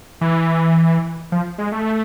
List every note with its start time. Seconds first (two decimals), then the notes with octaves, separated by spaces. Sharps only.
0.21 E3
1.32 F3
1.58 G#3
1.72 A3